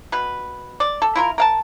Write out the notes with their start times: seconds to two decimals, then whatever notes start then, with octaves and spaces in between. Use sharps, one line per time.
0.12 B2 B4
0.80 D5
1.02 A4
1.15 E4 F4 A#4
1.38 A#4 F5 A5